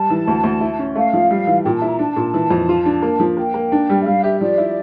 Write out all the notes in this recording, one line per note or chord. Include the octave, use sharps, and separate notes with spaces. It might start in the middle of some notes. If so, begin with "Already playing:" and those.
Already playing: G3 A5
E3
D2
D2
E4
C#4
A3 F5
F3
G3
E3
A#2 G5
A5
E4
A#5
D4 A5
A#2
E3
F2
F4
D4
A#3
F3
A#3 G5
A#3
D4
G3
E5
G3 F5
G4 E5
F3 D5
E4